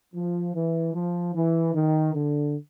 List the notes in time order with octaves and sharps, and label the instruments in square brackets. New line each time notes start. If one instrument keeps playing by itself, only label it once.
[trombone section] F3
E3
F3
E3
D#3
D3